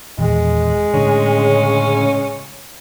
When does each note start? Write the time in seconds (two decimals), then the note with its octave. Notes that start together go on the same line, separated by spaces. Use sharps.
0.19 D#1 E2 G#3
0.94 A2 D3 C#4
1.34 C#3